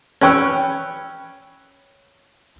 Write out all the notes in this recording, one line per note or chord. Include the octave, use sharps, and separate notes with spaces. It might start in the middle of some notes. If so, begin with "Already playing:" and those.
C#4 B4 C#5 G5 E6 F#6